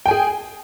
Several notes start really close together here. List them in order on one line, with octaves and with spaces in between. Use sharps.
G5 G#5 G#4